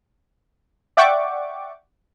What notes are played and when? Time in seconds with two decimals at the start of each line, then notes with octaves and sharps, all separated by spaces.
0.97 D5 E5 F#5 G5 C#6 D6